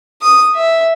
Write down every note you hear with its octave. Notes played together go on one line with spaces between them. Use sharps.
D#6
E5